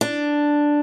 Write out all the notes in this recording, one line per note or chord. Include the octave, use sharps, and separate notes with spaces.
D4